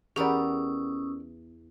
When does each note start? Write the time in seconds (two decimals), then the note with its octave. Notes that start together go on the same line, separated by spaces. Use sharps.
0.16 E2 B3 C#4 G4 A#4 D5 D#6 E6